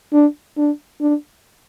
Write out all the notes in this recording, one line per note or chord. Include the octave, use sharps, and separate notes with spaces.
D4
D4
D4